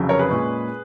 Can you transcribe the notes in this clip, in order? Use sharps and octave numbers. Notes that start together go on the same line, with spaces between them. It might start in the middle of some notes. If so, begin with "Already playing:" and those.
Already playing: F1 F2 C#3 F#3
A#4 C#5
G#4 B4
A#2 G#3 C#4